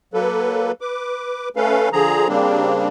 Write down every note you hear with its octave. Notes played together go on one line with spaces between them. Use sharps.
F#3 A#3 A4 B4
B4 D6
A3 C#4 A4 B4 F5
D3 F3 G#4 A#5
C#3 G3 A#3 C4 D4